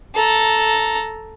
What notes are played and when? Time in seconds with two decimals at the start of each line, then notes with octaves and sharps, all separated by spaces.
0.15 A4 A#5